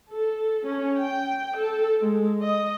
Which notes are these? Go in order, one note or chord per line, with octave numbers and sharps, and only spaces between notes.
A4
C#4
G5
A4
G#3
D#5